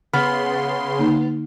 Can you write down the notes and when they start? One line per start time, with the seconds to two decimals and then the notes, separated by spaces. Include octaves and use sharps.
0.13 C#3 B3 B5 C6 F6
0.99 D3 A#3 D#4